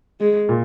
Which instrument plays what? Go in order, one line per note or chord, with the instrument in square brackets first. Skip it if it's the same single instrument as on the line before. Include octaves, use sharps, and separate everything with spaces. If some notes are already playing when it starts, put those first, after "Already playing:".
[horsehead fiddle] G#3
[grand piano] A#2